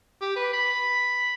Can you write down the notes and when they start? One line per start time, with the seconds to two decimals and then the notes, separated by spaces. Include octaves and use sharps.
0.21 G4
0.36 B4
0.53 B5